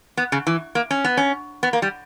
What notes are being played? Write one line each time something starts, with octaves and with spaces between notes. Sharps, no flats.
B3
C#3
E3
A#3
C#4
B3
C#4
B3
A#3
G3